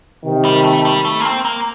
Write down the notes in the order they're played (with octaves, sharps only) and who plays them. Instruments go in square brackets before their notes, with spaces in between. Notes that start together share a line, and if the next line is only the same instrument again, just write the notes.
[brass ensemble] C3 D#3
[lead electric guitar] G3
A3
G3
A3
A#3
C4
A#3